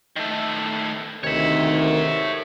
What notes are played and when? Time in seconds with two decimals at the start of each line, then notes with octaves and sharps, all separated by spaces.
0.16 D#3 A3
1.24 D2 C3 D#3 C#5 E5